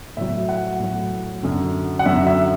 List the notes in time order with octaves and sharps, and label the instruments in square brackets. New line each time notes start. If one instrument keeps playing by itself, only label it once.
[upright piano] A2 F#3 E5
F#5
A2 F#3
F#2 D3 F#3
F#5
F#2 D3 F#3 E5
E5